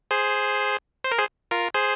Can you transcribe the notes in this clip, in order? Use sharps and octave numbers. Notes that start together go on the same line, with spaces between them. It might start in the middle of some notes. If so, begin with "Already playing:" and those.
G#4 C5
C5
A#4
G#4 C5
F4 A#4
G#4 C5